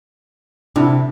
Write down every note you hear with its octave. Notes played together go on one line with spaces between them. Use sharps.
C3 D4 E4